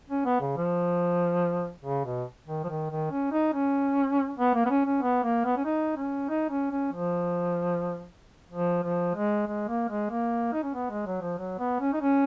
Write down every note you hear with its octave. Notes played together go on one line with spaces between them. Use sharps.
C#4
B3
C#3
F3
C#3
B2
D#3
F3
D#3
D#3
C#4
D#4
C#4
B3
A#3
B3
C#4
C#4
B3
A#3
B3
C#4
D#4
C#4
D#4
C#4
C#4
F3
F3
F3
G#3
G#3
A#3
G#3
A#3
D#4
C#4
B3
G#3
F#3
F3
F#3
B3
C#4
D#4
C#4